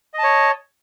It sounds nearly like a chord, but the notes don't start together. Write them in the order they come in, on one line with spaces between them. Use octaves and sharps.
D#5 A5 C#5